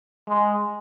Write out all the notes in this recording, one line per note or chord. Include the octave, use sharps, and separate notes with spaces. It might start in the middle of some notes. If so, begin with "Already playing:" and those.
G#3